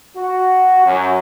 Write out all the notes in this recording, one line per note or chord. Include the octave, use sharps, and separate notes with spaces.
F#4
F#2